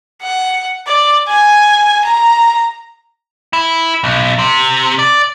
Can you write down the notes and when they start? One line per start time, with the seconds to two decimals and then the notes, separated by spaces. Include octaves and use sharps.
0.22 F#5
0.87 D5
1.28 G#5
2.05 A#5
3.53 E4
4.04 B1
4.39 C3
4.99 D5